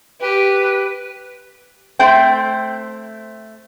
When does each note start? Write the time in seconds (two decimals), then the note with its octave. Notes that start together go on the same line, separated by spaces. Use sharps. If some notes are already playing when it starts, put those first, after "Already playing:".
0.20 G4 B4
1.99 A3 C4 C5 G5